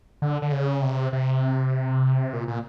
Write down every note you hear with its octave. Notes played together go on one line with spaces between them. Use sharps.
D3
D3
C#3
C3
C3
A#2
A#2